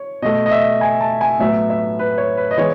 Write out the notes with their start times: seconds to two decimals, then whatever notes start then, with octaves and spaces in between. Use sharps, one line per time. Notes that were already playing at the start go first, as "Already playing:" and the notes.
Already playing: C#5
0.22 B2 A3 D#5
0.46 D#5
0.51 E5
0.81 G#5
1.01 A5
1.21 G#5
1.39 A2 F#3 B3 E5
1.70 E5
1.99 B4
2.18 C#5
2.37 B4
2.51 D#5
2.57 E3 G#3 B3 C#5